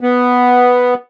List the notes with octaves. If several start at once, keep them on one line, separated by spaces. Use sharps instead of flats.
B3